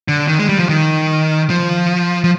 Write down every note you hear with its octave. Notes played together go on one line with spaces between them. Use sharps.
D3
D#3
G#3
G3
F3
D#3
F3
F3